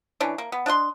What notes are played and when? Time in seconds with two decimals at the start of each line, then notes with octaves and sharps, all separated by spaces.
0.21 E3 C#4 D4
0.38 A#3
0.52 B3
0.66 D4 D#5 F#5 C6